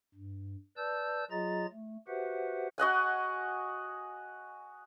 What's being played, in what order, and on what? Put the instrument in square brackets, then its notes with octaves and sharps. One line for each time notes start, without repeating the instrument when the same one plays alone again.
[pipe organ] G2
B4 D5 A5 E6 G6
F#3 F4 G#4 D#5 A#5 A6
A3
F#4 G4 B4 C5 E5 F#5
[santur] F#4 D#5 F#5 G#5